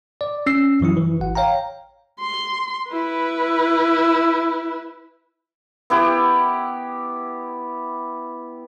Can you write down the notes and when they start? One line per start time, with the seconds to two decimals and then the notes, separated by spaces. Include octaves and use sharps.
0.21 D5
0.46 C#4 E6 C7
0.81 F#2 E3 F#3 E4
0.97 E3
1.20 G#1 F#5
1.35 C#5 F5 G5 A#5
2.20 C6
2.91 E4 B4
5.90 B3 E4 G4